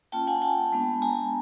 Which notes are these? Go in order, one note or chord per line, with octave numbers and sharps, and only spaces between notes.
A#3 C#4 F4 G5 A5
F#5 G#5
G5 A5
G#3 B3 D4
G#5 A#5